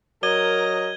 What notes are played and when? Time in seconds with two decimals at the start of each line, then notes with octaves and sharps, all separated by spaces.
0.23 F#3 A#4 D#5 G#6 D#7 G7